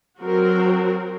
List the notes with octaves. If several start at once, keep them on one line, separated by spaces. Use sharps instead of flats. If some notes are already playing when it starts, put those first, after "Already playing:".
F#3 C4 F#4 A#4